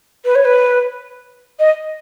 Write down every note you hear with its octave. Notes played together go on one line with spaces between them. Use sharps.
B4
C#5
B4
D#5